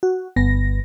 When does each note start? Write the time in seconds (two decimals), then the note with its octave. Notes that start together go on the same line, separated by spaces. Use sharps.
0.03 F#4
0.36 G1 B3 A#6